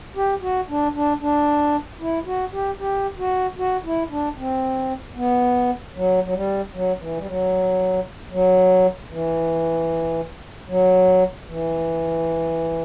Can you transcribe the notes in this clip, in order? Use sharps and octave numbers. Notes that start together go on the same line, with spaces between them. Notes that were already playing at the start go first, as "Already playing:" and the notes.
G4
F#4
D4
D4
D4
E4
F#4
G4
G4
F#4
F#4
E4
D4
C4
B3
F#3
F#3
G3
F#3
E3
G3
F#3
F#3
E3
F#3
E3